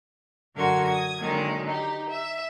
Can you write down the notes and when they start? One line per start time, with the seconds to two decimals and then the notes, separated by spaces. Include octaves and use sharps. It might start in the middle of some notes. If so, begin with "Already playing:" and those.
0.54 F#2 D3 F#4 A#4 C6 G#6
0.86 D#6 G#6
1.20 D3 D#3 F#3 G#3 A#3
1.67 D#4 G4
2.10 E5